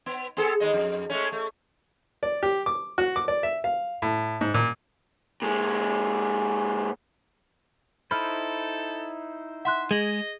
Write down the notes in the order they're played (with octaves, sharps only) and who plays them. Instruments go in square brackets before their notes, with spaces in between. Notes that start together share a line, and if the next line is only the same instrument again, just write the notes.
[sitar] B3
B3 G#4 A4
D#2 G#3 D#5
F2
G#3 A3 C#4
A3
[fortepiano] D5
G4
D6
F#4
D6
D5
E5
F5
A2
G#2
A#2
[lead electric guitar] A#2 G#3
[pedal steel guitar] D#4 E4 C5 [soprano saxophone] A4 [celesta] B5 F6
[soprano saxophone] E5 [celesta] F#5 C6 F#6
[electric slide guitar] G#3 [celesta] G#4 G#6 F#7 [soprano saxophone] D#5